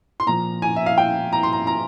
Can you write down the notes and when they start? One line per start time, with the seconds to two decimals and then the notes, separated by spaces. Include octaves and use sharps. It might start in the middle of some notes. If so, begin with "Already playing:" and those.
0.20 C6
0.27 A#2 F3 A#5
0.62 G#5
0.76 E5
0.86 F5
0.98 G5
1.33 A#5
1.43 C6
1.53 A#5
1.67 A#5